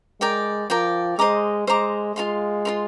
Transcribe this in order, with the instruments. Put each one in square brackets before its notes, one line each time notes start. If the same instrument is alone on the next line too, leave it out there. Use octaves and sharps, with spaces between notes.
[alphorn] G#3 [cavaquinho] A#4 D5 G5
[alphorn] F3 [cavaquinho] A#4 D5 G5
[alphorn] G#3 [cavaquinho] C5 D#5 A#5 D6
[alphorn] G#3 [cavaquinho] C5 D#5 A#5 D6
[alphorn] G#3 [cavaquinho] F4 A#4 F5 C6
[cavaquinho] F4 A#4 F5 C6